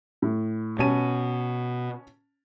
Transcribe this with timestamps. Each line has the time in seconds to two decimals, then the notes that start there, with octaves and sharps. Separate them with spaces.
0.22 A2
0.79 B2 C#4 A5 D#7